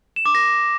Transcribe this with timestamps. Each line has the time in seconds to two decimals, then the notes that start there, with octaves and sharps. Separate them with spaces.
0.16 E7
0.26 D6
0.35 A#6